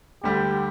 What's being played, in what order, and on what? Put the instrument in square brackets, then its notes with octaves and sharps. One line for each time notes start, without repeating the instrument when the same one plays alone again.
[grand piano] D2 D3 G3 [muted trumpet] G4